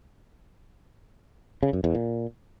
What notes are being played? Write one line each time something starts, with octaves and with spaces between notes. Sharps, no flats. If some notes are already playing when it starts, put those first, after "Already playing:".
C#3
F#2
E2
A#2